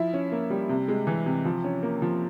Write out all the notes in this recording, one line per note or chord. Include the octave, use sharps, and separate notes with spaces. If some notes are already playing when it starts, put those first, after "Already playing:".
Already playing: F3 E4
C#4
A#3
G3
C3
G#3
E3
C3
F3
C#4
A#3
F3